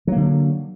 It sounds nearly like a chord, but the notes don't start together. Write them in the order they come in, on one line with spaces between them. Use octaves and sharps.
F#3 A#3 D3